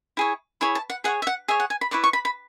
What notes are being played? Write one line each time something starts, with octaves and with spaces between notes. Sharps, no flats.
E4 G#4 C#5
E4 G#4 C#5 B5
A5
F#5
G#4 C#5 F#5
E5
F#5
G#4 C#5 E5
F#5
G#5
B5
E4 B4 D5 C#6
C#6
B5
B5